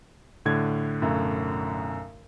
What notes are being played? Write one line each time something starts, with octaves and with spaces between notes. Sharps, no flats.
A2 D3 G#6
B1 F#2 A3